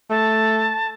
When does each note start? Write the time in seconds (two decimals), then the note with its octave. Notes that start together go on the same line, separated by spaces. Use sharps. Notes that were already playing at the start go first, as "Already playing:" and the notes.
0.10 A3 A5